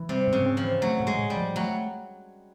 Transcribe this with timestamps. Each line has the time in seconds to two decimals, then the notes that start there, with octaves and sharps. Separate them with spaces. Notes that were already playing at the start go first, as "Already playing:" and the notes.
Already playing: E3
0.09 C3 G3
0.27 G#2
0.33 C#3
0.46 C4
0.57 F3
0.64 E3
0.82 F#3 A3
1.00 A2
1.07 G#3
1.19 A2
1.30 G3
1.37 F3
1.56 F#3 A3